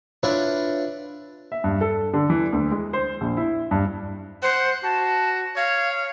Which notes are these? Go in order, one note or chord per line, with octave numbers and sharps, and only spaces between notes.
D4 E4 F4 B4 C#5 D5
E5
G2
A4
D3
E3
D2
G#3
C5
A#1
E4
G2
C5 F#5
F#4 A5
C#5 F5